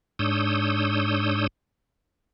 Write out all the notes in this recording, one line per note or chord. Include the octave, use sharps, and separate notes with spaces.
G#2 D4 C#5 D#6 E6 G6